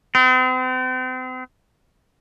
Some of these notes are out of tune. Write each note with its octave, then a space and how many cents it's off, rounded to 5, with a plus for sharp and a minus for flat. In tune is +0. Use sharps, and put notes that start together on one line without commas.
C4 -40